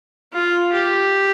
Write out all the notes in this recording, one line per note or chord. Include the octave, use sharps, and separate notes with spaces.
F4
G4